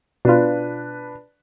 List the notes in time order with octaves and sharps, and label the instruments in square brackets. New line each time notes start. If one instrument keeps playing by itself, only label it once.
[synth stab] B2 F4 [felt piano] D4 B4